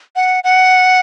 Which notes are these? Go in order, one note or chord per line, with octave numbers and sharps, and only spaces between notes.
F#5
F#5